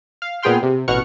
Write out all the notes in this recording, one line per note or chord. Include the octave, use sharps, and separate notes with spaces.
F5
A#2 B3 G#4 G5 C6 F6
C3
A1 B2 F#5 C#6 F6 C#7